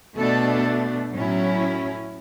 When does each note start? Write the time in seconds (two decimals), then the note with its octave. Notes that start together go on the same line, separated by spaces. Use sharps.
0.18 B2 A3 D4 A4
1.13 A2 F#3 C#4 E4